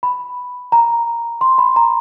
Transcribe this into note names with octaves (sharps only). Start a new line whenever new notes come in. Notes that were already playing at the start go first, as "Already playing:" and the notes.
B5
A#5
C6
B5
A#5